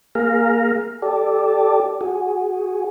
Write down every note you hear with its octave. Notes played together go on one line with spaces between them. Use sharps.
A#3 G#4 F5 A#5
G4 A4 D5
F#4 G#4